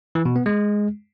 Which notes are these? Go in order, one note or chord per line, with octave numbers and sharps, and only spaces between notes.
E3
B2
B3
G#3